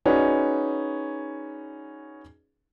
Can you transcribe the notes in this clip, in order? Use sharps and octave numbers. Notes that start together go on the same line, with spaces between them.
C#4 D#4 F#4 G#4 B4 D5